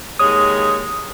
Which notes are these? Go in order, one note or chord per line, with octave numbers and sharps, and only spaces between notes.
D#2 G#3 C#5 D#6